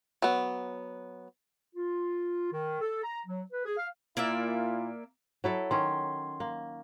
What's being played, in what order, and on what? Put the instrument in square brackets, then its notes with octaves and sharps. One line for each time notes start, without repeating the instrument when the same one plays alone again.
[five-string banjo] F#3 B3
[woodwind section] F4
D#3
A4
A#5
F#3
B4
G#4
F5
[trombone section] A#2 E4 F4 [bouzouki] A#3 D5 E5
[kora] F#3 E4 A4
[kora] D#3 C#4 [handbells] C6
[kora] A#3